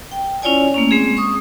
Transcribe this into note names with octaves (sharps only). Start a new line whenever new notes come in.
G5
C#4 E4 F4 C#5 D5 G#5
A3 A#3 C#4
G#3 C4 G#4
C#6 D#6